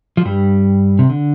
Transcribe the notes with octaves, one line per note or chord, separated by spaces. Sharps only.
F3
G2 G3
C3
D3